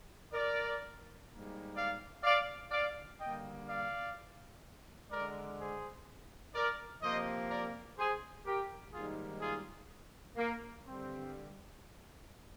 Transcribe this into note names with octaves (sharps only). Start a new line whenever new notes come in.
A#4 D5
G#2 G3 A#3
D5 F5
D5 F5
D5 F5
D3 G3 A#3 D#5 G5
D5 F5
D3 G#3 A#4 D5
G#4 C5
A#4 D5
C3 F3 A#3 C5 D#5
A#4 D5
G#4 C5
G4 A#4
G#2 D#3 G3 A#3 F4 G#4
F4 G#4
A#3
G2 D3 G3 C4